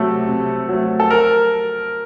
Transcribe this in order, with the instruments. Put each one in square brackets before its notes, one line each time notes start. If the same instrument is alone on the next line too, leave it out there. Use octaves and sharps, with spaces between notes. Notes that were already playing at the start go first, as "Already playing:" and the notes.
Already playing: [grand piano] C3 F#3 A3 A4
C3
F#3 A3
A4
A#4